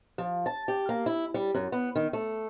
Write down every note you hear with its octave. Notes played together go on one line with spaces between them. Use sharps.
F3
A5
G4
A#3
E4
G3
F#2
B3
D#3
A3